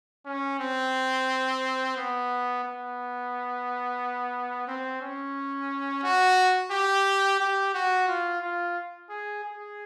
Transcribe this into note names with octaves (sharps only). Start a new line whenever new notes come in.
C#4
C4
B3
B3
C4
C#4
F#4
G4
G4
F#4
F4
F4
G#4
G#4